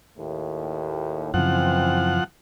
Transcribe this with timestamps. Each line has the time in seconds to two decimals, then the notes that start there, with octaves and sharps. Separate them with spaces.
0.18 D#2 A2
1.34 F#2 C#3 E3 F3 C4 F#5